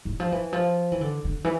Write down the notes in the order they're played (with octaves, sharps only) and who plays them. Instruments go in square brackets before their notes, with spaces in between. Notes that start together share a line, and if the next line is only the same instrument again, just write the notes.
[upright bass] E3
F3
E3
F3
E3
D3
D3
E3